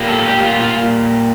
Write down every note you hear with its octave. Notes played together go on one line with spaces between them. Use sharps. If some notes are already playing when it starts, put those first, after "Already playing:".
Already playing: A#2 G3 A#3
A4
G4
F4
F4